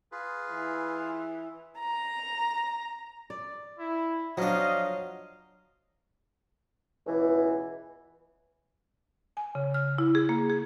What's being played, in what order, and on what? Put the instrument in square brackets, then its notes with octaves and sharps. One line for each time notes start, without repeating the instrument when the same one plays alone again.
[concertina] F4 G#4 B4
[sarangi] E3
[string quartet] A#5
[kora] D5
[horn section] E4
[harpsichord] F3 D4 [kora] F#3 F4 [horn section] D#5 F5
[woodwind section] C#2 B2 E3
[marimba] G#5
C#3
F6
E4
G#4
A#3
G#4